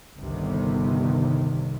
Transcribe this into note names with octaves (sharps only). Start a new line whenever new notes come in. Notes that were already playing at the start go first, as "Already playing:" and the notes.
G1 C2 C3 D#3